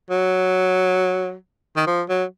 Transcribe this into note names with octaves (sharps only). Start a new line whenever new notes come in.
F#3
D#3
F3
F#3